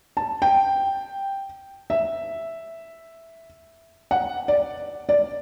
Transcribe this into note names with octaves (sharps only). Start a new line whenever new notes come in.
A5
G5
E5
F#5
D5
D5